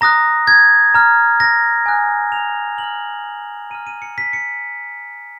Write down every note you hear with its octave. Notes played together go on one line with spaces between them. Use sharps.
A#5 D#6 F#6 A#6
G#6
A#5 F6
A#6
G#5 D#6 F#6
F7
A#5 F6 F#7
A#5 F6 D#7
D#7
C#7
B6
C#7